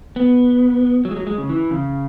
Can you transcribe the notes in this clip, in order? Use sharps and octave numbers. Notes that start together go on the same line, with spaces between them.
B3
F#3
G#3
F#3
G#3
C#3
E3
C#3